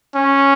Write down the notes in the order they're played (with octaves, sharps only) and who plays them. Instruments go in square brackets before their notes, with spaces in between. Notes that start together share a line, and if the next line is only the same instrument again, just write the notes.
[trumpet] C#4